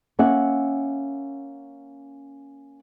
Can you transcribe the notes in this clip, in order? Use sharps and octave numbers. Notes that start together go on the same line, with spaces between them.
A#3 C#4 E5 F#5